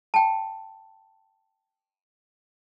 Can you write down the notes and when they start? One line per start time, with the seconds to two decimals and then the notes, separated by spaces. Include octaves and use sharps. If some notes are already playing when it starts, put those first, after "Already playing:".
0.14 G5 A5